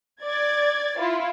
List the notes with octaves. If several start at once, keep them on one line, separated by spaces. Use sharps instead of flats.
D5 G#6 A6
E4 F4